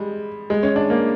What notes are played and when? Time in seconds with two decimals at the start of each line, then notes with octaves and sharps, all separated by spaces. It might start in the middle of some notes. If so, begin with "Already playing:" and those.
Already playing: G3 G#3
0.50 G#3
0.63 C#4
0.76 D4
0.90 A#3